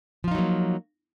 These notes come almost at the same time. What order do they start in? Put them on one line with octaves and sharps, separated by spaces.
F3 F4 D#4 F#3 A#3